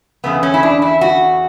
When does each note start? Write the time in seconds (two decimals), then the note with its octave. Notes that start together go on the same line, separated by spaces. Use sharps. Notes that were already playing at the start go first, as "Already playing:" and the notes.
0.24 E2 C#3 A3 B3
0.43 C#4
0.54 E4
0.63 D4
0.82 E4
1.01 F#4